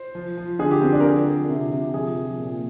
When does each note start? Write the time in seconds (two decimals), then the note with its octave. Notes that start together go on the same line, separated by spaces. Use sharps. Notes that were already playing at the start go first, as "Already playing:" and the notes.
Already playing: C5
0.15 F3
0.37 F3
0.59 D3 G#4
0.71 G4
0.82 D3 C4
0.92 D4
1.00 A#4
1.04 F3 G#4
1.26 F3
1.49 C3
1.71 C3
1.94 F3 G#4
2.16 F3
2.38 A#2